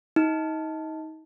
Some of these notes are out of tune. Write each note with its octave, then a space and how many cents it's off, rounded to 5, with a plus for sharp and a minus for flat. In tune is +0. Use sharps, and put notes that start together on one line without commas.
D#4 +30